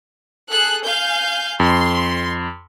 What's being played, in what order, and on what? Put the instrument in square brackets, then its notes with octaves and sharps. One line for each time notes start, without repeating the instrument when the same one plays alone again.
[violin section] G#4 A4 F#6
F5 G#5 G6
[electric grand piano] F2 [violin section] C6